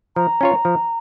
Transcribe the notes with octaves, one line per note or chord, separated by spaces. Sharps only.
F3 A#5
C#4 F4 C#5
F3